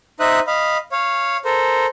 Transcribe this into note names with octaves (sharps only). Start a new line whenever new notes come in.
D#4 C5 E5 D#6 F#6
D#5 F5 B5
C#5 F5
A4 A#4 C5